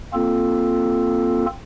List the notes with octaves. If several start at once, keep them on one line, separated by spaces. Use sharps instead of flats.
A#3 C4 F4 A4